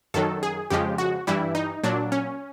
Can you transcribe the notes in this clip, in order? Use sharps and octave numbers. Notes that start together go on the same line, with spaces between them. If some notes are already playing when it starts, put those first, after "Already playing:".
F#2 D#3 F#3 A4
G#4
F2 C#3 F3 G#3 G4
F#4
G2 E3 G3 E4
D#4
A#2 F#3 D4
C#4